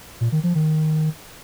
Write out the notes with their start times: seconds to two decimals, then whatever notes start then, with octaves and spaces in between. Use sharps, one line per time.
0.21 A#2
0.32 D#3
0.44 F3
0.55 D#3